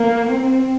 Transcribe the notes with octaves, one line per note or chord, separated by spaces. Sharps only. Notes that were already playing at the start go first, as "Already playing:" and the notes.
Already playing: A#3
C4